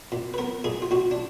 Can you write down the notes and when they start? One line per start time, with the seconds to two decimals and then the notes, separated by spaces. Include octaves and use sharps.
0.12 A#2
0.34 B4
0.38 B3 A#4
0.64 A#2 G#4
0.82 F4
0.91 A#2 F#4
1.11 D4